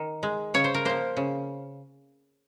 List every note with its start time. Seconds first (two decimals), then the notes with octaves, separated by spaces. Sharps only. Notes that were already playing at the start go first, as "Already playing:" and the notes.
Already playing: D#3
0.23 G#3
0.54 C#3 C#5
0.64 C5
0.74 A#4
0.85 F3 A#3 C5
1.17 C#3